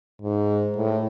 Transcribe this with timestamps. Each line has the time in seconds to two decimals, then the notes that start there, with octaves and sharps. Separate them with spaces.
0.22 G#2
0.77 A2